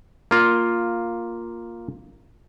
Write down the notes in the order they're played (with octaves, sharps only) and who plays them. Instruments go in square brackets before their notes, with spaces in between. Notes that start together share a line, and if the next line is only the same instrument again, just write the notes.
[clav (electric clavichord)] A#3 F4